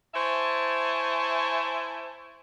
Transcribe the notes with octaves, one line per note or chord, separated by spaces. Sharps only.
E4 C5 C#5 E5 G#5 A5